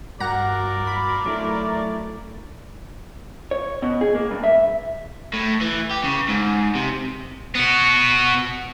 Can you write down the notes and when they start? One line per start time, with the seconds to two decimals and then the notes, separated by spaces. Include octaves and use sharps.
0.20 G2 F#4 A#4 D5 F#5 A#5
0.87 B5
1.26 F#3 A3 D4 E4
3.51 C#5
3.82 B2
4.01 G#4
4.15 A#3
4.31 G2
4.44 E5
5.34 A2
5.61 E3
5.91 G4
6.04 C#3
6.29 G#2
6.75 C3
7.55 B3 F#4